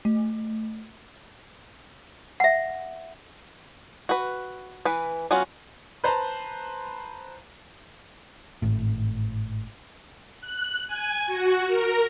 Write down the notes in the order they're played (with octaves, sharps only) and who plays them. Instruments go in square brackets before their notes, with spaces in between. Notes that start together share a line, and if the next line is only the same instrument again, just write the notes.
[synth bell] A3
[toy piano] E5 F#5
[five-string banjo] F#4 B4
E3 B4
F#3 B3 C#4 F4 F#4
[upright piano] B4 C5 A5 A#5
[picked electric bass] G#1 A2
[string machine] F#6
G#5
F#4
A#4